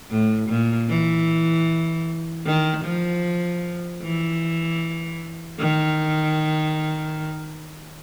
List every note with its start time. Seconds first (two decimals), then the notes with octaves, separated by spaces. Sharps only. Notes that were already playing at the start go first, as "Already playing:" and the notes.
0.11 A2
0.49 A#2
0.89 E3
2.46 D#3
2.85 F3
4.02 E3
5.60 D#3